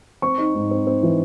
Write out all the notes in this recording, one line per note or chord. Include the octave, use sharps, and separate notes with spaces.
C4 C#6
D#4
G#2
C4
C4
E3